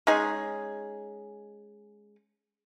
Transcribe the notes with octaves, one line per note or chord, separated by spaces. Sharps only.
G#3 C#4 D#4 G#4